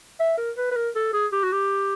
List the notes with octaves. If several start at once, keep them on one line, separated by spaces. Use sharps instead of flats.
E5
A#4
B4
B4
A#4
A4
G#4
G4
F#4
G4